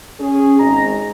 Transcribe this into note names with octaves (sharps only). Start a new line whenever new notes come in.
C#4 G#4
G#1 D#5 A#5